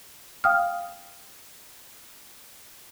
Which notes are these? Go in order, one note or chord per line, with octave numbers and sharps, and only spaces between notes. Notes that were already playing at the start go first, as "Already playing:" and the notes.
F5 G5 D#6 F6